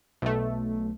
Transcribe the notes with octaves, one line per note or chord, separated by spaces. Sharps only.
B1 A3